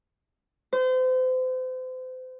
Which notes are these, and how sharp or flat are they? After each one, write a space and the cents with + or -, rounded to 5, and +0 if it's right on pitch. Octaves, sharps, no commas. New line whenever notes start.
C5 -35